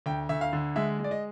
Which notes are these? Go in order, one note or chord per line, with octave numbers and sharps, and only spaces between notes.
D2 G5
D2 E5
F5
D3
G#3 E5
G#3
D5
D#5